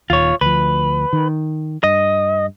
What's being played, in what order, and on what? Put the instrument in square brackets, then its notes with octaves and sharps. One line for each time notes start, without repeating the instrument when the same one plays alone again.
[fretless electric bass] D#1 D#2 [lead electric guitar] F4 C#5
[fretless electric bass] D2 F3 [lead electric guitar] B4
[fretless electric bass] D#3
[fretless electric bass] G2 [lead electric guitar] D#5